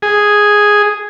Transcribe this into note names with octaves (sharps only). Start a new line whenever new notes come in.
G#4